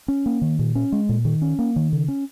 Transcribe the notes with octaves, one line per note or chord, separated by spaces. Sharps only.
C#4
A#3
D#3
A#2
C#4
G#3
A#2
D#3
C#4
A#3
D#3
C#3
C#4